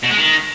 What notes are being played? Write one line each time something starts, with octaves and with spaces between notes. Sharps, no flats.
B2
G#3
D#3